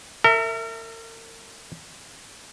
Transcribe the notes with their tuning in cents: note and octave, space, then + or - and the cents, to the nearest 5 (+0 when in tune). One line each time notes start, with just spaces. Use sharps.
A#4 -40 E5 +0